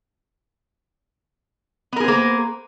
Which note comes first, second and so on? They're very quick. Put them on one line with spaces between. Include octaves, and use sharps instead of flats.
B3 A#4 G#4 C5 A#3